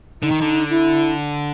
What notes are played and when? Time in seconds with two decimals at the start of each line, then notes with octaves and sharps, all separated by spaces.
0.22 D3 D#4
0.31 D#3
0.41 D3
0.69 E4